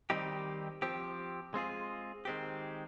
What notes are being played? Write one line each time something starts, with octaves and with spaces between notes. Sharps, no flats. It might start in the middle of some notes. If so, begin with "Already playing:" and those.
D#3 G3 C4 D#4 G4
F3 C4 G4
G#3 C4 F4 G#4
D#3 G#3 C4 G4